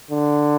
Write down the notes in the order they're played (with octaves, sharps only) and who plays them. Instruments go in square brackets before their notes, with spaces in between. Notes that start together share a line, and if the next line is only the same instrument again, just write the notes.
[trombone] D3